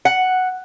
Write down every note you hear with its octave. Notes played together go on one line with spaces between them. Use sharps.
F#5